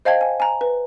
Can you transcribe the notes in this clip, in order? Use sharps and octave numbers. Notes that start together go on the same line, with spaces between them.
C5 D#5 F5 G5 A5 G#6
G#5
G#5 A#5
B4